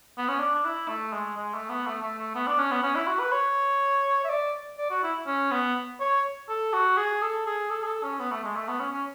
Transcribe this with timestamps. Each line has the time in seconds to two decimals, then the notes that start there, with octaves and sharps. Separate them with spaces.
0.18 B3
0.28 C#4
0.39 D4
0.55 D4
0.65 E4
0.88 A3
1.13 G#3
1.37 G#3
1.54 A3
1.69 B3
1.86 A3
2.02 A3
2.18 A3
2.35 B3
2.47 D4
2.59 C#4
2.71 B3
2.83 C#4
2.95 E4
3.07 F#4
3.19 B4
3.32 C#5
4.24 E5
4.29 D5
4.77 D5
4.90 F#4
5.03 E4
5.27 C#4
5.51 B3
6.00 C#5
6.49 A4
6.73 F#4
6.97 G#4
7.22 A4
7.46 G#4
7.70 A4
7.82 G#4
7.87 A4
8.03 C#4
8.19 B3
8.31 A3
8.44 G#3
8.56 A3
8.68 B3
8.80 C#4
8.92 C#4